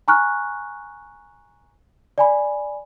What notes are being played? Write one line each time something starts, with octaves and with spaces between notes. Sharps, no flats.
G#5 A#5 C#6 F6 F#6
D5 G#5 B5